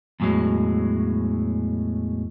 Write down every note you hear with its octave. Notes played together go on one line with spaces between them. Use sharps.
E2 A2 F#3 G#3